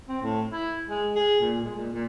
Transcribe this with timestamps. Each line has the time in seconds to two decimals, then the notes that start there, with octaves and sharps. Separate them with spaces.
0.07 C4
0.22 A2
0.50 E4
0.87 G#3
1.15 G#4
1.40 A#2
1.64 G#3
1.75 A#2
1.92 A#2